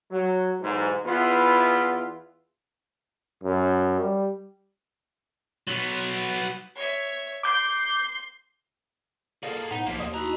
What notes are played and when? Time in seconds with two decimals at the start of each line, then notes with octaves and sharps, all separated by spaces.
0.11 F#3
0.61 B1 E2 G#2
1.05 E2 B3 E4 F4 B4
3.44 F#2
4.00 G3
5.67 F#3 B3
6.75 C#5 E5
7.43 C6 D6 G6
9.43 A#3 D#4 F4 G#4 A4
9.71 A2 B3 D#4
9.86 B1 F3 A#3 E4 F4
10.00 D#2 D#5
10.14 D#4 E4 F#4 A#5 B5